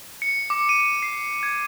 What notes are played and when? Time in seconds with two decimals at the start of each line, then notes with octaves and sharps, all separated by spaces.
0.22 C#7
0.50 D6
0.69 D#7
1.02 C7
1.43 G#6